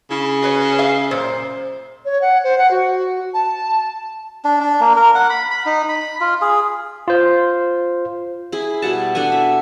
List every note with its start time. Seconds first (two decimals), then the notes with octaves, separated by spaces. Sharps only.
0.11 C#3 E4
0.42 F#4 B4 C#5
0.79 G#4 E5 F5
1.11 F#2 A#2 C5
2.05 C#5
2.22 F#5
2.44 C5
2.58 F#5
2.71 F#4
3.34 A5
4.45 D4
4.60 D4
4.80 A#3
4.96 A#4
5.15 F#5
5.30 B5
5.51 B5
5.66 D#4
5.89 B5
6.21 F4
6.41 G#4
7.08 F4 C5
8.52 E4 G#4
8.82 B2 G3 F#5 A5
9.15 D4 A4 F#5 G#5
9.32 E5